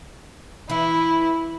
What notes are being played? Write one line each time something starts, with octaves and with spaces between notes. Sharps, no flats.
E3 E4